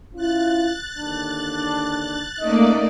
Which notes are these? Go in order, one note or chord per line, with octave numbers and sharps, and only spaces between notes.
C#4 E4 F4 F#6 A6
D#2 D3 D4
A3 A#3 C#4 D#4 D5 D#5